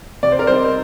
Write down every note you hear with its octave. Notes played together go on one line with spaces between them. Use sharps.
C3 D5
C5
A#4
G3 C4 D#4 C5